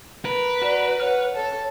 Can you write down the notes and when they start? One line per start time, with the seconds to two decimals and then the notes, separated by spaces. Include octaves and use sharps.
0.25 A#4 B4
0.62 F#4 A#4 D5
1.00 C#5 F#5 F6
1.34 A4 C#5